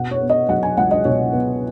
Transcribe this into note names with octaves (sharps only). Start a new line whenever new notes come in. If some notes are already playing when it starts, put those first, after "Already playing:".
Already playing: B2 F#5
C#5
B3
D#5
F#3 F#5
G#5
C#2 F#5
D#5
B2 C#5
B3